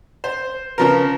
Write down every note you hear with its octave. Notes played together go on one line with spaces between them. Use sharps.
C5
C#3 F3 A#4 B4